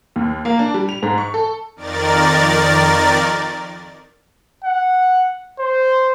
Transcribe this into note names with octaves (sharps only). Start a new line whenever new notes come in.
D#2
A#3
D4
G3
F7
G#2
C#6
A4
F2 D#3 A#4 D5 A6
F#5
C5